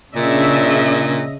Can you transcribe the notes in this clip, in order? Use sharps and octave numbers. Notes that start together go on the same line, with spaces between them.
A#2 C#3 D4 D#5 E5